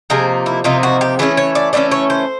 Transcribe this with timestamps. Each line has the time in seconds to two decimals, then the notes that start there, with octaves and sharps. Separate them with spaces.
0.10 C3 F3 A#3 D#4 G#4
0.46 E4
0.64 C3 F3 A#3 D#4 F4
0.83 F#4
1.01 G4
1.19 E3 A3 C#4 G#4
1.37 C#5
1.55 D5
1.73 E3 A3 C#4 D5
1.91 C#5
2.10 C5